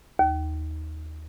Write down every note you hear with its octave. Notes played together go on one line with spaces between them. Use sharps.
D#2